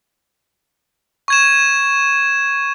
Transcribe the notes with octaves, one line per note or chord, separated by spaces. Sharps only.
C#6 G#6 E7